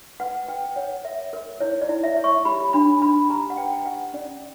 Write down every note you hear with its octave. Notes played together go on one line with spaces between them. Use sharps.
B4 F#5
B4 G5
C#5 F#5
A#4 E5
A#4
E4 C#5
D5
E4
E5
C#5
C#6
G4 B5
D4 B5
D4 B5
G4 A#5
F#5
B4 G5
G4 F#5
C#4 D5